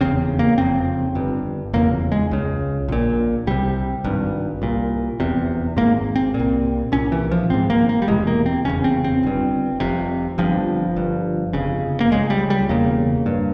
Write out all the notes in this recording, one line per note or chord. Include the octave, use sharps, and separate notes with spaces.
F1 E2 C#3 C4
A#3
F1 F2 C#3 C4
G1 G2
F1 E2 C#3 A#3
G#3
C#2 C#3
A#1 A#2
C2 C3 G3
G#1 G2
C2 A#2
F1 E2 C3
G#1 G#2 A#3
C4
A#2
C2
C2 A#2 C#4
E3
F3
G#1 G#2 C4
A#3
A#3
G3
E1 E2 C3 G#3
A#3
C4
F1 E2 C#3 C#4
C4
C4
G1 G2
F1 F2 C3
G1 G2 F3
G1 G2
G1 F2 C#3
A#3
C#2 C#3 G#3
G3
G3
E1 E2 C#3 A#3
G2